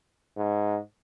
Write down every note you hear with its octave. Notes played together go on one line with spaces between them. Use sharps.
G#2